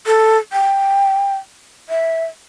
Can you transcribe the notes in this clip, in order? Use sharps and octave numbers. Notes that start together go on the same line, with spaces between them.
A4
G5
E5